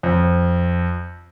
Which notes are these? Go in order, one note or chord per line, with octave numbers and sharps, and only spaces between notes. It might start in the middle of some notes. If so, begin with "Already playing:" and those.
F2